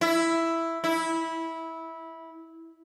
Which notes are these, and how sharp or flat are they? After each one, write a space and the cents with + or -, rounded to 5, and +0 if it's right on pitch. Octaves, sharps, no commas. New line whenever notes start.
E4 +5
E4 -15